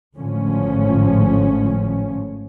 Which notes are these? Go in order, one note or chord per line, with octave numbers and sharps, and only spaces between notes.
G#1 A2 D3 F3 C#4